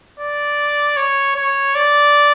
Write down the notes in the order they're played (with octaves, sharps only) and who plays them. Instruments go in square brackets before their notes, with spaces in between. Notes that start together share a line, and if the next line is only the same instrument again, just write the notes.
[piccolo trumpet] D5
C#5
C#5
D5